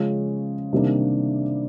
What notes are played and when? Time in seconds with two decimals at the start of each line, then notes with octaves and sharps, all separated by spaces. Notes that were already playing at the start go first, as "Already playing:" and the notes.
Already playing: C#3 F3 G#3 C#4
0.73 C3 D#3 G3 A#3 D4